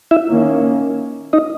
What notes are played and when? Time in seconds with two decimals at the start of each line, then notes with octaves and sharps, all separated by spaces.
0.11 E4 E5
0.29 D#3 A#3 C#4
1.33 D#4 D#5